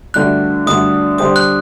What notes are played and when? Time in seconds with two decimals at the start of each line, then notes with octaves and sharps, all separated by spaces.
0.14 G2 D3 A3 D4 F#4 F#6
0.66 G2 D3 A3 D4 F#4 D#6
1.18 D3 G3 D4 G4 C5 D#6
1.36 F#6